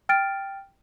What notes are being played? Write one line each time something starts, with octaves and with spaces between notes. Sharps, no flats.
G5 F6 A6 D7